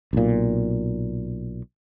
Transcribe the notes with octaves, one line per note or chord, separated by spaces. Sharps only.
B1 A#2